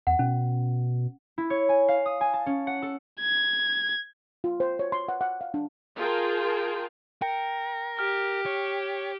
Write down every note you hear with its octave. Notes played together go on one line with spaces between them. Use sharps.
E2 F#5
B2 C#4
E4
C#5
G#5
F5
D#6
G#5
A5
C#4
F#5
A4
G#6
F4
C5
C#5
C6
F#5
F#5
F5
D4
F4 G#4 A#4 G5 A5
A#4 G5
G4 F6
C#5